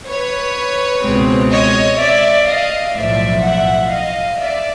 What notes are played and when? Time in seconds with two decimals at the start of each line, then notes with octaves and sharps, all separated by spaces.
0.08 B4 C#5
1.04 C#2 B2 G#3 C4
1.52 C#5 D#5
2.00 D5 E5
2.48 D#5 F5
2.96 B1 A2 F3 D5 E5
3.44 E5 F#5
3.92 D#5 F5
4.40 D5 E5